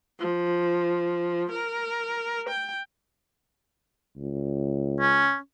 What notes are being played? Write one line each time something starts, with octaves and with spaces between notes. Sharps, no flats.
F3
A#4
G5
C#2
C#4